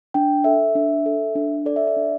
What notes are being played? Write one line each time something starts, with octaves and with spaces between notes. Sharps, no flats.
D4 G5
A4 E5
D4
A4
D4
A4 D5
E5
D5
D4